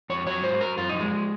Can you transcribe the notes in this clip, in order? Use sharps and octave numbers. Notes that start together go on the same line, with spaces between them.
F2 C#5
F#3 C#5
G#2 C5
F#3 A#4
F#2 F4
D#4
F3
G#3